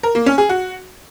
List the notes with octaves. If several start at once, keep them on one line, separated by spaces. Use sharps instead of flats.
A#4
A#3
C#4
G#4
F#4